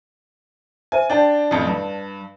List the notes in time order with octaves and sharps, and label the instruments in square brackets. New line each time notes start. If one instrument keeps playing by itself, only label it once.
[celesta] C5 E5 D#7 [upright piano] G#5
[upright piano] D4 G5 [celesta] D5 A5 A6
[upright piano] A1 F2
G2